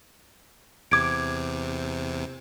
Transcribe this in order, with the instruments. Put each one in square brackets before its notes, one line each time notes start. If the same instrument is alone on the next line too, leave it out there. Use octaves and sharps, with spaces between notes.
[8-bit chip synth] E2 C3 [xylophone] D6 G#6 D7